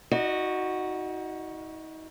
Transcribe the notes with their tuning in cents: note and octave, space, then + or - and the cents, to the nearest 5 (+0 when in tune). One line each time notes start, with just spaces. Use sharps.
D#4 +40 F#4 +0 D#5 -35